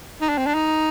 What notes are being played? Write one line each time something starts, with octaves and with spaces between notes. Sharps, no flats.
D#4
D4
C4
D4
D#4